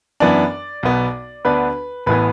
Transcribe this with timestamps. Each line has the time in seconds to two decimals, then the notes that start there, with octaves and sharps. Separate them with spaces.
0.20 F#2 E3 B3 D4 D5
0.83 B1 B2 B3
1.45 D2 D3 B3 D4 B4
2.06 A1 A2 E3 B3 B4